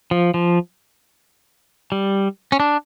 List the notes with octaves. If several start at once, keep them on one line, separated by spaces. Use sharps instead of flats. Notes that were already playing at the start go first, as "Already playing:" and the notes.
F3
F3
G3
C#4
D4